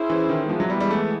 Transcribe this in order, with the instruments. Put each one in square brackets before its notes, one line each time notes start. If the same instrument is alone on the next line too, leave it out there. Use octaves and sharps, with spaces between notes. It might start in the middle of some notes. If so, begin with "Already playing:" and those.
Already playing: [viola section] C#4 E4 G#4 C5
[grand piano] E3
D#3
[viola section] E3 G#3 B3 [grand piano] F3
[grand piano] F#3
G3
G3
A3